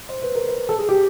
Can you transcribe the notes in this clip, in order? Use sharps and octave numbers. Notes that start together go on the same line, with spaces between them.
C5
B4
A#4
B4
A4
G#4
G4